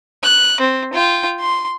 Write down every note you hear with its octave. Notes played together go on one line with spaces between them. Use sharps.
F#6
C4
F4 G5
C6